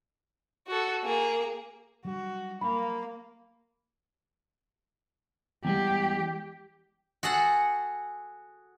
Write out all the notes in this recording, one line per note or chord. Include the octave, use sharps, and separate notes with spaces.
F#4 A4
A#3 G#4
F#3 G3 D4 F#4
A#3 B5
E2 G3 G#3 G4
F#4 G#4 A4 F#5